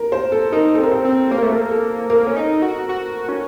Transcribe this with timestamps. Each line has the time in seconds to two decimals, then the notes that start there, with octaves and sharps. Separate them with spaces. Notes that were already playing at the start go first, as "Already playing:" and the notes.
Already playing: A#4
0.12 C5
0.32 A4
0.52 D#4 A#4
0.75 A4
0.78 C4
0.83 A#4
0.91 C5
1.05 C4
1.31 A#3 C5
1.38 A#4
1.43 A3 A4
1.52 A#4
1.55 A#3
1.71 A4
2.10 A#3 A#4
2.27 C#4
2.36 D#4
2.62 F#4
2.89 F#4
3.29 C#4